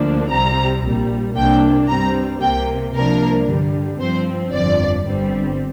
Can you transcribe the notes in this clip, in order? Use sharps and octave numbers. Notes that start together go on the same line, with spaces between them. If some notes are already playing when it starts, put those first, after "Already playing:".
Already playing: D2 D3 F3 A#3 D4
C2 C3 G3 C4 A#5
A#1 A#2 G3
C2 C3 A#3 D4 G5
G2 G3 C4 A#5
C2 C3 A#3 G5
C2 C3 F3 A#3 D4 A#4
G2 D3 G3
G2 F3 C4 C5
G1 F2 F3 D5
G1 G2 G3 C4